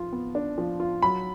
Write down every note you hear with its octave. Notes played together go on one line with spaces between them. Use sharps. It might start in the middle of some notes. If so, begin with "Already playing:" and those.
Already playing: F3 F4
B3
D4
F3
F4
F#3 B5